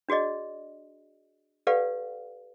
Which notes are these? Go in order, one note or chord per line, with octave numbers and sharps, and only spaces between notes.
D4 F#4 G#4 D5 D#5
G4 A4 B4 D5 F5 F#5